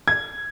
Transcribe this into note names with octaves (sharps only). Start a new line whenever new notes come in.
G#6